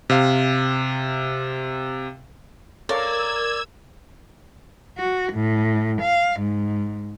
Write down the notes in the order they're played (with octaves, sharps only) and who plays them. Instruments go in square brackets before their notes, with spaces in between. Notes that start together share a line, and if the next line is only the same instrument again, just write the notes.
[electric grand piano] C3 F5
[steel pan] A4 C#5 F5 [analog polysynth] A#4 [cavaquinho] D5 [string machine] E6 G#6
[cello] F#4
A2
F5
G#2